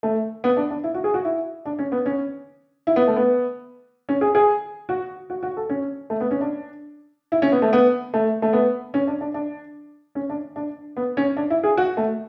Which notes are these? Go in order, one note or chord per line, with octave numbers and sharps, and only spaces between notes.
A3
B3
D4
D4
E4
F#4
G#4
F#4
E4
D4
C#4
B3
C#4
E4
B3
A3
B3
C#4
G#4
G#4
F#4
F#4
F#4
A4
C#4
A3
B3
C#4
D4
E4
C#4
B3
A3
B3
A3
A3
B3
C#4
D4
D4
D4
C#4
D4
D4
B3
C#4
D4
E4
G#4
F#4
A3